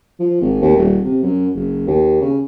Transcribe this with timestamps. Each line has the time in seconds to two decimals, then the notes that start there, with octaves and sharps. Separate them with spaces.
0.20 F3
0.41 G#1
0.62 D#2
0.77 D#1
1.04 C3
1.23 F#2
1.55 F#1
1.87 D#2
2.21 C#3